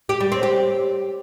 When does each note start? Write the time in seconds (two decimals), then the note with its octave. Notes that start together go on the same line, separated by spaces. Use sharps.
0.09 G4
0.20 G3
0.32 C4
0.43 G4